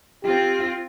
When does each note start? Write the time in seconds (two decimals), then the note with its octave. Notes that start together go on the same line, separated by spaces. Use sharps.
0.24 C4 F4 G4